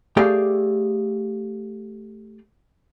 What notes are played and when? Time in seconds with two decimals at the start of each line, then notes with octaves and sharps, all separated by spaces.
0.17 A3 G4 G#4 D5 F5 G5